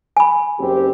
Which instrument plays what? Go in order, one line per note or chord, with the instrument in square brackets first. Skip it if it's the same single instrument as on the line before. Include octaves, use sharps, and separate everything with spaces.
[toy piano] G#5 B5
[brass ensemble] F#1 C4 G4